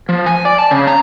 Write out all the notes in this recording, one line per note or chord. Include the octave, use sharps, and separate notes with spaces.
F3
G#5
D5
A5
C#3
A#5